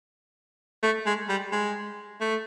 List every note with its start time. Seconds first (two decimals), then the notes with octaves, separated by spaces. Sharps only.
0.83 A3
1.06 G#3
1.29 G3
1.52 G#3
2.20 A3